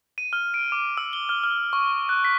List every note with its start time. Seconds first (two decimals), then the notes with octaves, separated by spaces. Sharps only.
0.18 D#7
0.33 F6
0.54 D7
0.72 D6
0.97 E6
1.13 G7
1.29 F6
1.44 F6
1.73 C#6
2.09 F#6
2.25 B6